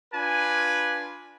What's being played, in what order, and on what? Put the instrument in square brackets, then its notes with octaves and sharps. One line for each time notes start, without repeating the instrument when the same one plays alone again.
[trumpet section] D4 F4 B4 G#5